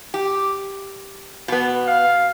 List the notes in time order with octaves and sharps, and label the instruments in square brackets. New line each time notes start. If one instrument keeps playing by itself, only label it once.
[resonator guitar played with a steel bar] G4
B2 B3
[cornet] F5